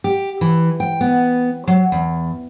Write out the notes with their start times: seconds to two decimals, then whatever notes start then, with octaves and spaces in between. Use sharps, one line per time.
0.04 G4
0.41 E3
0.80 G5
1.01 B3
1.67 F#3
1.92 E2